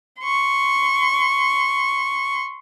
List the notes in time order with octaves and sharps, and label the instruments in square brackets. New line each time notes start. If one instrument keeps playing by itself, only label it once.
[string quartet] C6 C#6